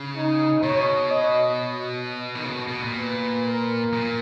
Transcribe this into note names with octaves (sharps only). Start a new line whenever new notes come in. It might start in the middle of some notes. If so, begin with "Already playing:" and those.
Already playing: C#3
D#4
B2 C#5
D#5
D#3
C#3
B2
B2
A#2
B4
A#4
A#2